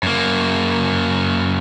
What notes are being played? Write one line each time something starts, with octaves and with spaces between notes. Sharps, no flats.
F#2 A#3